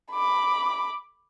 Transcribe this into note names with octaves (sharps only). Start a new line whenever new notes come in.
B5 D6